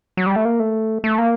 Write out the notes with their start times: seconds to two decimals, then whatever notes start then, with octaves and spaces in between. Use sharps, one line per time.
0.17 F#3
0.27 G3
0.36 A3
0.45 A#3
0.60 A3
1.04 A3
1.18 A#3